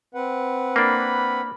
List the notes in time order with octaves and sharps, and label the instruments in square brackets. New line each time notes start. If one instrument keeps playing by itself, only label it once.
[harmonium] C4 B4 F#5
[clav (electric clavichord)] A#3 D4 [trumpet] B5